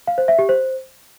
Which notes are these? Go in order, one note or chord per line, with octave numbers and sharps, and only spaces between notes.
F5
C5
E5
G4
C5